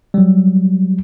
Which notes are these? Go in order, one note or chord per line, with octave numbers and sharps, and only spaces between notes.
F#3 G3